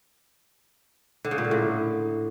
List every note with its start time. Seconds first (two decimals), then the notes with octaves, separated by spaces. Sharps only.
1.25 D3
1.31 C#3
1.38 A#2
1.45 D3
1.51 A2